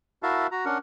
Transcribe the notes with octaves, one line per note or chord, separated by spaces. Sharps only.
E4 F#4 A#4 E5 F5 A5
F#4 A#5
C#4 D4 A#4 F#5